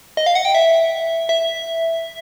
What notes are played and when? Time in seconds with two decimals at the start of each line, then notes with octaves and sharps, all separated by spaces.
0.17 D#5
0.26 F5
0.35 F#5
0.45 G5
0.55 E5
1.29 E5